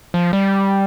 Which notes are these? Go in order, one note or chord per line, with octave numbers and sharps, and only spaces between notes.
F3
G3